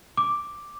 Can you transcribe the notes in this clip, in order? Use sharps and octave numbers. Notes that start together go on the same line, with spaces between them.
D6